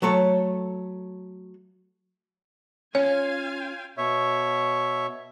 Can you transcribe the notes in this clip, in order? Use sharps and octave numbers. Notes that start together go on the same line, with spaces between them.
F#3 A3 A4 C#5
C#4 F4 C#5 F5 G#5
B2 C#5 E5